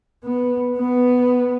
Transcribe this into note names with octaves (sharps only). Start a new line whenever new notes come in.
B3
B3